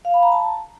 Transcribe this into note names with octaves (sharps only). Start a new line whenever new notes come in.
F5
B5
A#5
A5